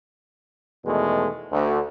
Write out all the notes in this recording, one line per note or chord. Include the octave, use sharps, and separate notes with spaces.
E2 B2 D#3 G#3 A3
D2